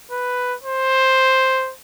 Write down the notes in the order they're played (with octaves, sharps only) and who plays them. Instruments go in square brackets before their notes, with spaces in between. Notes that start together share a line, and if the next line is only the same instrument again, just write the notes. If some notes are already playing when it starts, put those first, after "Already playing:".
[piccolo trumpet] B4
C5